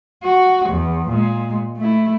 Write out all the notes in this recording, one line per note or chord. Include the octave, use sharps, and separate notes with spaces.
F#4
E2
A#2 G#3
A3 E4